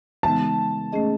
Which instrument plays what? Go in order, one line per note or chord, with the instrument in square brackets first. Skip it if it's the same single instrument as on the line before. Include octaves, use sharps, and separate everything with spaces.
[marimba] C#3 E3 G#3 B3 D#4 [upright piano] A5
[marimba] A3 C#4 G#4 D#5